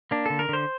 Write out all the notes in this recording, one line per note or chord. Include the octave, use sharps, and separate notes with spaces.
A#3 D4
D3 A4
A#4
D3 C5